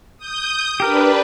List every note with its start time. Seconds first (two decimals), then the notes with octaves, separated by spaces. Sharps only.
0.18 D#6 G6
0.80 D4 G4 A#4 B4